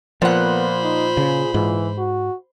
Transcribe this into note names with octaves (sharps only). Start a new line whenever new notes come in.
A#2 F3 B3 C5 F#5 B5
D#4
C#3 G#4
G#2 E3
F#4